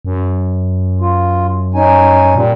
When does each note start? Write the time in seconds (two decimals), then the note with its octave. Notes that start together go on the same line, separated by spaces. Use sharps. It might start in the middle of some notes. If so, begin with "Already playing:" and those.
0.05 F#2
1.01 F4
1.74 C#4 D#4 G#5
2.35 A#2 G3